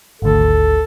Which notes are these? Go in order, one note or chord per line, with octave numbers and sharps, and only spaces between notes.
G#1 D2 A4